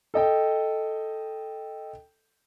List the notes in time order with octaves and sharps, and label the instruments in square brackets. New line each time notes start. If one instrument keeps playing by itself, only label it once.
[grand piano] A4 D#5 G5